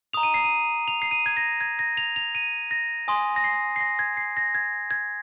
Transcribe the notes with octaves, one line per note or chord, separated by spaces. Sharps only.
A#5 D#6 F7
D#7
C7
D#7
F7
C7
D#7
G#6
A#6
G#6
A#6
F7
F7
D#7
A#6
G#5 C6 D#6
A#6
C7
C7
A#6
G#6
C7
A#6
G#6
G#6